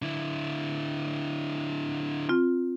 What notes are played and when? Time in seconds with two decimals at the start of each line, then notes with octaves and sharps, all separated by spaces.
0.02 D3 E4
2.29 C4 F4